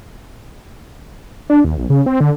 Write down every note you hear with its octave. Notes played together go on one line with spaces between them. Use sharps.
D4
D#2
B1
C#3
C4
D3